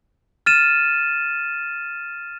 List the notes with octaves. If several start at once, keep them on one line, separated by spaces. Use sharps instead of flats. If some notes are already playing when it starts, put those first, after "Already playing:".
F6 A6 D#7 E7